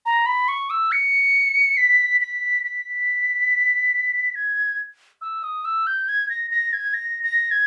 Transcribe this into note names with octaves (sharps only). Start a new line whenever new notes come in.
A#5
B5
C#6
E6
C#7
B6
B6
B6
G#6
E6
D#6
E6
G6
G#6
A#6
A#6
G#6
A#6
A#6
G#6